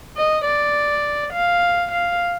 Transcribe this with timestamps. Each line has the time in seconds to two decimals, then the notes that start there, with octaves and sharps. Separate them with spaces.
0.16 D#5
0.45 D5
1.33 F5
1.91 F5